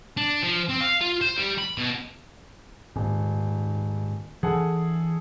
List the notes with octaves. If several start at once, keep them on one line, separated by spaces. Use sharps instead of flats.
D4
F3
C4
F5
F4
C5
G3
B5
B2
D#1 G#2
E3 D4 G#4 A4 F#5